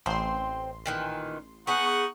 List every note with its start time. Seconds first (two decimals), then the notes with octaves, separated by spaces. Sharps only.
0.06 A1 C4 C5 C6
0.86 A#2 D#3 E3
1.67 B3 D#4 G#4 F#5 C#6